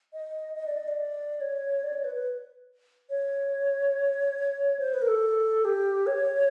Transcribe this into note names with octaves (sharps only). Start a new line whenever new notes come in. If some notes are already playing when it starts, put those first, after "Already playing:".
D#5
D#5
D5
D#5
D5
C#5
D5
C#5
B4
B4
C#5
C5
B4
A#4
A4
G4
C#5